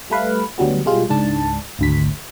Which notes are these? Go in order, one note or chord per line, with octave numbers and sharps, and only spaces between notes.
G3 A3 B4 F5
D2 F#3 G3 B3
B2 G3 G#3 F4
C#2 G#2 D4 A5
G#1 D2 B6